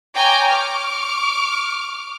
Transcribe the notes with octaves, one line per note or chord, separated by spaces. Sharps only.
C#5 G5 G#5 A#5 D6
C#6 D6 F6